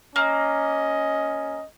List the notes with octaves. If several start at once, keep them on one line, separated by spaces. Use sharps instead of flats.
A#3 C#4 D#5